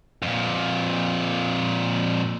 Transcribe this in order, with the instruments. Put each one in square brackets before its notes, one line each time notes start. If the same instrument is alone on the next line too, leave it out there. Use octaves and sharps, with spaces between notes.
[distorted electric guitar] F2 A#2